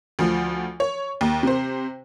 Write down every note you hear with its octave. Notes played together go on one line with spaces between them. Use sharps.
D2 F3
C#5
D#2
C3 C5